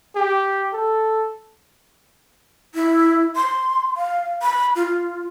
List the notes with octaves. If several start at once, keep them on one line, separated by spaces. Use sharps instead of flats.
G4
A4
E4
C6
F5
B5
F4